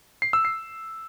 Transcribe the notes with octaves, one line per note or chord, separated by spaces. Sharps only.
C7
E6
C7